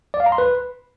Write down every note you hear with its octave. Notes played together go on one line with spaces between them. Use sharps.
D5
F5
A#5
C6
B4